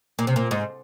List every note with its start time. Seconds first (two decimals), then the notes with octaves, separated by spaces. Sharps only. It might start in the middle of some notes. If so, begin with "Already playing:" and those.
0.19 A#2
0.27 C3
0.36 A#2
0.51 G#2